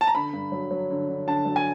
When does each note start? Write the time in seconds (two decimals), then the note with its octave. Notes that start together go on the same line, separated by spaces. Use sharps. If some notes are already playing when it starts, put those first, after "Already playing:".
0.01 A5
0.07 A#5
0.15 D3 B5
0.33 G2
0.52 F#3
0.71 F#3
0.90 D3
1.09 D3
1.27 D3 A5
1.45 F#3
1.56 G#5